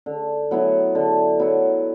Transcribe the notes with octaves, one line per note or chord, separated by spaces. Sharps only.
D3
F#3 B3 E4
D3
F#3 B3 E4